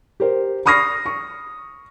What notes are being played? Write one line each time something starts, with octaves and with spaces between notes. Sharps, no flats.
G4 A#4 C5
B5 C#6 D#6 F6 A#6 C7
C#6